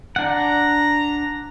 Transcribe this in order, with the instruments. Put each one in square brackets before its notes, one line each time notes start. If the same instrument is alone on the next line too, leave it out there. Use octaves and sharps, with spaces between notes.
[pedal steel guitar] D4 F#5 [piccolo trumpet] A#5